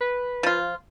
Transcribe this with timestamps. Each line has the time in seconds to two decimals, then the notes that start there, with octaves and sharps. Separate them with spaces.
0.01 B4
0.43 F3 F4